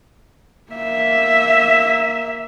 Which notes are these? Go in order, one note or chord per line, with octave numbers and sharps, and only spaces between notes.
A#3 E5